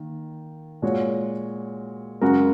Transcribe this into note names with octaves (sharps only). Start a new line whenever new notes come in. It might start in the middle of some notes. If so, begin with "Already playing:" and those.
Already playing: D#3 A#3
A#2 G#3 F#4 C#5
F#2 C#3 G#3 F#4 A#4